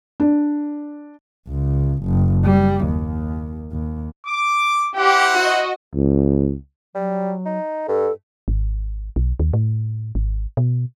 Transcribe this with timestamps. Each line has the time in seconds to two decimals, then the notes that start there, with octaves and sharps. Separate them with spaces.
0.20 D4
1.48 C#2
2.04 F#1
2.45 G3
2.85 D#2
3.72 D#2
4.27 D6
4.97 E4 G4 C5 F#5
5.36 F#4 D#5
5.95 C#2
6.95 F#3 G3
7.45 D#4
7.88 G2 A4
8.48 G#1
9.16 B1
9.40 D#2
9.53 A2
10.15 G#1
10.57 B2